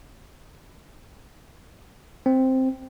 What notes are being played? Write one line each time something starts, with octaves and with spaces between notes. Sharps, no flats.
C4